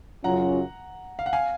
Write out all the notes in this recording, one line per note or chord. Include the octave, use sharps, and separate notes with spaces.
F#2 C#3 F#3 C#4 F4 F#5 A#5
F5
F#5
F5 G#5